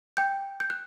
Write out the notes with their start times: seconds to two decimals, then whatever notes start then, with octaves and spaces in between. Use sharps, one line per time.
0.17 G5 G6
0.60 G6
0.70 F#6